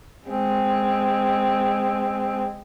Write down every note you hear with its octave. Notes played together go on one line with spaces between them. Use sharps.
G#3 C4